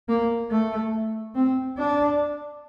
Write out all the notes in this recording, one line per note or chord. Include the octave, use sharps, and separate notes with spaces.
A#3
A3
C4
D4